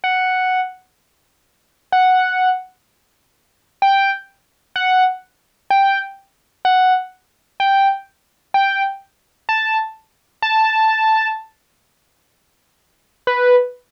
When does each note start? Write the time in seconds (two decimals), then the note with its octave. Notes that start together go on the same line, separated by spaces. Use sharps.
0.04 F#5
1.92 F#5
3.82 G5
4.76 F#5
5.70 G5
6.65 F#5
7.60 G5
8.54 G5
9.49 A5
10.42 A5
13.27 B4